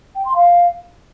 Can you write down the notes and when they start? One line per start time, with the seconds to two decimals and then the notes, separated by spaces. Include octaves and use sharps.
0.15 G5
0.25 C6
0.35 F5